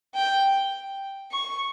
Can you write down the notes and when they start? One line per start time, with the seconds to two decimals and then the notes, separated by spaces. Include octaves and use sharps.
0.15 G5
1.31 C#6